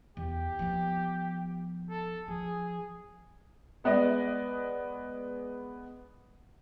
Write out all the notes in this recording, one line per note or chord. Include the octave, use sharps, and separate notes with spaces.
E2 G4
F3 B3
A4
F3 G#4
G#3 B3 D5 D#5